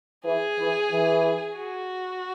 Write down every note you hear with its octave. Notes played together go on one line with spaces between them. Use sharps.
E3 G#4
E3
E3
F#4